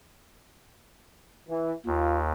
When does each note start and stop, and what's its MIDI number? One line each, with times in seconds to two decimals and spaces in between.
1.49 1.73 52
1.86 2.33 39
1.86 2.19 65